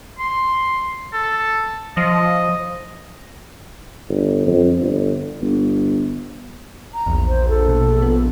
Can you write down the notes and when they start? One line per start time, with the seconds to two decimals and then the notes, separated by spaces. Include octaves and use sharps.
0.19 C6
1.14 A4
1.97 F3 D#5
4.09 G1
4.47 F2
4.78 G1
5.41 G1
6.94 A#5
7.06 A#1 E2
7.27 C5
7.49 A4
7.68 B2
8.02 B3